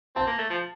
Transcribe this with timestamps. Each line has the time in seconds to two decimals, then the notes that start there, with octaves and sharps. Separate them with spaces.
0.16 C4 A5
0.27 A#3
0.39 A3
0.50 F3